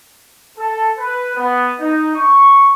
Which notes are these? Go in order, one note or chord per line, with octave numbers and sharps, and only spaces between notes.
A4
B4
B3
D#4
C#6